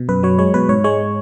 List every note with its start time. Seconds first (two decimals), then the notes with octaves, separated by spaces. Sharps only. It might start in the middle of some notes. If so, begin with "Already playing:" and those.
Already playing: B2
0.09 F#2 B4
0.23 F#3 C#5
0.39 G#3 C#5
0.54 B2 B4
0.69 G#2 C#5
0.84 G#3 C#5